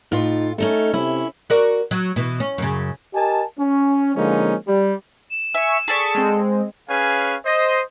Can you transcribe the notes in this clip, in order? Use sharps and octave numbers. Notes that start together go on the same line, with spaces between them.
A2 D#4 F4
A3 C#4 D#4 A4
C3 C#4 E4
F#4 A#4 D5
F#3
B2 E3
C#4
F#2 C#3
G4 A#4 D#5 G#5 A5
C#4
D3 F3 G#3 A#3 C#4 D#4
G3
E7
E5 G#5 C#6
G#4 A4 D5 C#6 A6 B6
G#3 C4
C#4 G#4 B4 C#5 F5 G#5
C5 D#5